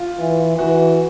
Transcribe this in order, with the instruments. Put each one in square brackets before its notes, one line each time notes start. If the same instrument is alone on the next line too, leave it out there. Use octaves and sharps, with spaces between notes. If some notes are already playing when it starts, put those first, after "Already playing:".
Already playing: [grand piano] F4
[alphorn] E3
[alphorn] E3 [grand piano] F#4